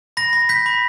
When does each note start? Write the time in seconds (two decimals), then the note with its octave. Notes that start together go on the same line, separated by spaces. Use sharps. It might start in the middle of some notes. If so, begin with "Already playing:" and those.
0.17 B5 A#6
0.33 B5
0.49 G6 B6
0.66 B5